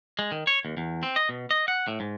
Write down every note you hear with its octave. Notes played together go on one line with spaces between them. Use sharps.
G#3
D#3
C#5
D#2
E2
C4
D#5
B2
D#5
F#5
A2
G#2